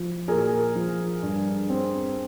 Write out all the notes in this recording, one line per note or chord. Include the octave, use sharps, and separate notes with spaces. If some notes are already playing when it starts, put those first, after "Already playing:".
Already playing: F3
A#2 G#4 A#4
F3
G2
C4